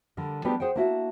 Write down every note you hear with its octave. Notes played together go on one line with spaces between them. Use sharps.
D3 G3 A#4
G3 B3 D4 D#4 G4 G#4
G#4 C5 F#5 G5
A#3 D4 E4 F#4 D#5 E5